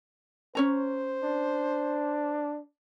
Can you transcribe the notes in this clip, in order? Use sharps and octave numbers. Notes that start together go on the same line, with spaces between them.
C#4 C5 C#5 A#5
D4